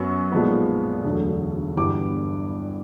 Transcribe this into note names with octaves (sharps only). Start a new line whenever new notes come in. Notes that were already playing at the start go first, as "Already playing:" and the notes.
Already playing: F#2 F#3 B3 C#6
B1 A#2 F3 G#3 B3
E1 D2 D3 F#3 A3
G1 G2 E3 G3 B3 D6